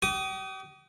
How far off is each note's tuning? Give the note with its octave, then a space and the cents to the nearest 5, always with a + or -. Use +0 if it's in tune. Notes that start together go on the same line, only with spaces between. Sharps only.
G4 -45 D#6 +0